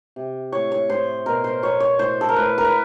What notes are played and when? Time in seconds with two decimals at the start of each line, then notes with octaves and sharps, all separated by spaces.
0.16 C3
0.52 A2 C#5
0.72 C#5
0.89 A2 C5
1.26 B2 A#4
1.44 C5
1.62 B2 C#5
1.80 C#5
1.99 A2 C5
2.21 A4
2.29 A#4
2.36 A2 B4
2.58 A#4
2.65 B4